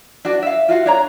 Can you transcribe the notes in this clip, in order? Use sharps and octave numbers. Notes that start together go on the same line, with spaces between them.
D4 F#4 D5
E5 F5
F4 F#4 F5 F#5
D4 C#5 A#5